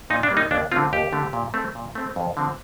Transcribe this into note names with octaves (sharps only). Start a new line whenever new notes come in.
A#2 D#4
D4
G3 A#3
D#4
D#2 D4
D3 A3 C4 F4
D#2 G4
D3 A3 C4
A#2
A3 C4
A#2
A3 C4
F2
D3 F3 C4